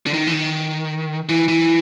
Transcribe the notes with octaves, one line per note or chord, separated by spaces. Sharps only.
D3
D#3
E3
D#3
E3
E3